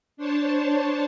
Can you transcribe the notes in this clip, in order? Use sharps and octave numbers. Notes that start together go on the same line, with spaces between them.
D4 C5 C#5 A5